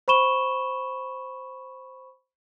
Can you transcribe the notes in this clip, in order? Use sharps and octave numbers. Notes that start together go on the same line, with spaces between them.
C5 B5 C#6 E7 G7